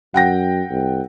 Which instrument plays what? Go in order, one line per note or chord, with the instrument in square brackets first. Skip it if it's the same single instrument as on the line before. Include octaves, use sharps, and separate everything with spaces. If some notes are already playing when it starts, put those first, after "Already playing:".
[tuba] F#2 [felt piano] F#5 G5 A#6
[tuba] C2